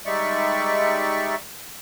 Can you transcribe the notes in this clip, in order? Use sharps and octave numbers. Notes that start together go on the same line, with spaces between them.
G3 G#3 D#4 D5 E5 C#6